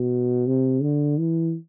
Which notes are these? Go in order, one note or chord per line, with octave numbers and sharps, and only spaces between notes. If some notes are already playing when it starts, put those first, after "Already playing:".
Already playing: B2
C3
D3
E3